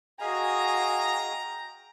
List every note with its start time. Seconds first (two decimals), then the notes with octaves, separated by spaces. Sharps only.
0.21 F#4 G#4 D#5 F5 G5 G#5 A#5